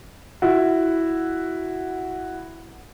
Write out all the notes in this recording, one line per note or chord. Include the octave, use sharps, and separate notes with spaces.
E4 F#4